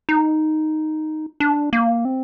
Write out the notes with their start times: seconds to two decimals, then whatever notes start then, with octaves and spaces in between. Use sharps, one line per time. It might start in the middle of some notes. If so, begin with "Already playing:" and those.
0.09 D#4
1.40 D4
1.73 A#3
2.05 C4